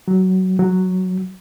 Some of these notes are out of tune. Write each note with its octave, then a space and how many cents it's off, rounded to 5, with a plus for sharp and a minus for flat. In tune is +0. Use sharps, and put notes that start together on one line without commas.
F#3 +15
F#3 +0